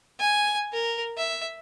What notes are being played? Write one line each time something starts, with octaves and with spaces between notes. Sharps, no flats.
G#5
A#4
E5